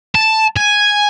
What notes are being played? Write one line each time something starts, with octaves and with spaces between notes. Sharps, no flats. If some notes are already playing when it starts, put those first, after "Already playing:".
A5
G#5